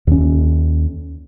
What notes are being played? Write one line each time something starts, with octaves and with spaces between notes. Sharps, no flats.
D#2 C#4